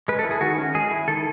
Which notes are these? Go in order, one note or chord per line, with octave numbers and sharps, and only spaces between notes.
G#3 B4
A4
E4
G#4
D#3 F#4
C#4
G#3 G#4
E4
D#3 A4